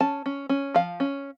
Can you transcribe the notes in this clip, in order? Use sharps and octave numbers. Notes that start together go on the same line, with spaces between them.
C#4 A5
C#4
C#4
F3 F5
C#4